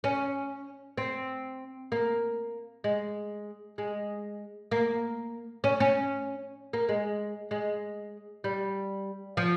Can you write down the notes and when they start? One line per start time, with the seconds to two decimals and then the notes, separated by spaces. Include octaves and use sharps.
0.04 C#4
0.98 C4
1.92 A#3
2.84 G#3
3.78 G#3
4.71 A#3
5.64 C#4
5.80 C#4
6.73 A#3
6.89 G#3
7.51 G#3
8.44 G3
9.37 F3